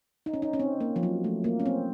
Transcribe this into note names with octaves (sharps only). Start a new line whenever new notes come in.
D#4
C#4
D#4
C#4
C4
A#3
F3
F#3
A3
A#3
C#4
C4